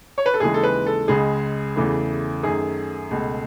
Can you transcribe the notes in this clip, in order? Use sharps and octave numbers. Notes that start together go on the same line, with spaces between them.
C#5
B4
A4
D#2 C#3 E3 G#3 G#4
A4
B4
A4
C#2 C#3 G#3 G#4
E2 C#3 E3 A3
F#2 D#3 A3 G#4
C#2 B2 A3